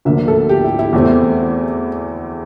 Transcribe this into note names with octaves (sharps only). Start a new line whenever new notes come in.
D2 D3 F3 A#3 E5
A4
G4
E4
E4
E2 E3 A3 C4